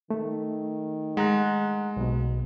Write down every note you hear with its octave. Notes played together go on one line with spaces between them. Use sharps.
D#3 A3
G#3 F#5 A#5 F#6
B1 B2